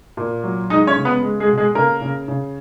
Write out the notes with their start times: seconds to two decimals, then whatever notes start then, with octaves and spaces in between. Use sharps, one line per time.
0.17 A#2
0.44 F#3
0.70 G#3 D#4 D#5
0.87 C#4 C#5
0.96 C#3
1.05 B3 B4
1.22 G#3
1.40 G#3 G#4
1.49 B2
1.58 G#3 G#4
1.75 C#3 A#3 A#4
2.02 C#3
2.28 C#3